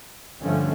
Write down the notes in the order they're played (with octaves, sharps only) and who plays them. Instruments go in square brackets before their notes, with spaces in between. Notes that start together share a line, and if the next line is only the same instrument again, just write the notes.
[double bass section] G2 D3 F3 A3 C#4